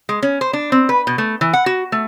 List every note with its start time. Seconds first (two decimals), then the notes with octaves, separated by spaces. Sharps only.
0.09 G#3
0.23 C#4
0.41 C5
0.53 D4
0.72 C4
0.89 B4
1.07 B2
1.18 A3
1.41 E3
1.53 F#5
1.66 F#4
1.92 A3